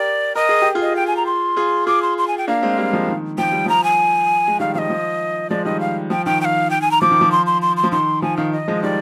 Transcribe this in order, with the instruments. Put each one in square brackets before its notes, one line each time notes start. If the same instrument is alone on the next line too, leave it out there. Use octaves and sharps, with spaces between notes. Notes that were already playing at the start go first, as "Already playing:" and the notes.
Already playing: [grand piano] G4 A#4 [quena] D5
[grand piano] A#4 [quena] D#5
[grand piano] G#4
G4
F4 G#4
[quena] D#5
G5
G#5
A#5
C6
[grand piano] F4 G#4
[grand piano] F4 G#4 [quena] D6
[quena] C6
C6
G#5
G5
[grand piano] A#3 D4 [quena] F5
[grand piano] G#3 C4
G3 A#3
F3 G#3
D#3
[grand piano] F3 [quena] G5
[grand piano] G3
[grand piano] F3 [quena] A#5
[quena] G#5
[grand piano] G#3
[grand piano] D#3 G3 [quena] F5
[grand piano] F3 [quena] D#5 F5
[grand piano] F3
[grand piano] F3 G#3 [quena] D5
[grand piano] D#3 G3 [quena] D#5
[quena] F5
[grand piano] F3 [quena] G5
[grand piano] D#3 [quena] G5
[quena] G5
F5
G5
G#5
A#5
[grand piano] F3 [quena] D6
[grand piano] D#3
F3
[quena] C6
C6
C6
C6
[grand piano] F3
[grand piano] D#3 [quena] C6
[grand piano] F3 [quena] G#5
[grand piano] D#3 [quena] F5
[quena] D#5
[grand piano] F3 G#3
[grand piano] D#3 G3 [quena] D5